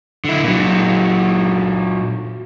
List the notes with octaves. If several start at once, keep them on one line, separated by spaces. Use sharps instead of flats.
D3 E4
A#2 F#3